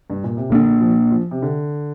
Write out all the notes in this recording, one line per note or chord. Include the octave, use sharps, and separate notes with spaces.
G2
A#2
C3
A#2 D3 A#3 D4
F3
F3
C3
D3